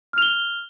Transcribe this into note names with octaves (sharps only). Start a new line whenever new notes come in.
F6 F7 G7